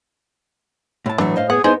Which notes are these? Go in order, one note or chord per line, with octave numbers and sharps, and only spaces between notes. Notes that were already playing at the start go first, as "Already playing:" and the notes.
A2 E4 A5
E3 F#3 A3 D4
C5 D#5 F5
B3 G#4 F#5
B3 D#4 E4 G#4 C5 D#5